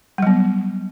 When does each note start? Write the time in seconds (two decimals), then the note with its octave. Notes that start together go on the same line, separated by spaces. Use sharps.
0.18 G3
0.23 F#3
0.27 B3